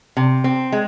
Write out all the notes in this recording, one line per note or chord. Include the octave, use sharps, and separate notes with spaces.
C3
C4
G#3